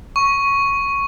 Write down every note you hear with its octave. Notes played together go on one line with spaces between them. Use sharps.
C#6